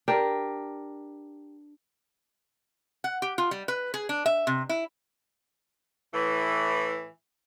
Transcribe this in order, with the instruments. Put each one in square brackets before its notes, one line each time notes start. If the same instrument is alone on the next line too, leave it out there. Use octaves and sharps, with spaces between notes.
[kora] D4 G4 A#4
[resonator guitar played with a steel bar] F#5
G4
F4
G3
B4
G#4
D4
E5
C3
E4
[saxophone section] A2 E3